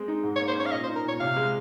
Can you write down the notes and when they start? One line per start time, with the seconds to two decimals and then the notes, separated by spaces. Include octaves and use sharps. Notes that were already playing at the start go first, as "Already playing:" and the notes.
Already playing: G#3 C4
0.08 D#4
0.23 G#2
0.36 C#5
0.40 A#3
0.48 C5
0.56 C#4 C#5
0.66 F5
0.72 A#2 D#5
0.84 C5
0.88 D#4
0.96 A#4
1.04 A#2 C#5
1.20 C3 F5
1.36 G#3